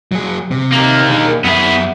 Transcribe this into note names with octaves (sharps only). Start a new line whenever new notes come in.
F#3 G#4
C3
D#3 A#3
D4 G#4
F#2 B3 G#4 E5